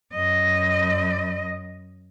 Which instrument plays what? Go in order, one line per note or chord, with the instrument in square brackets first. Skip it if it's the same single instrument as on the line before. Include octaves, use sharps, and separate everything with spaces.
[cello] F#2 D#5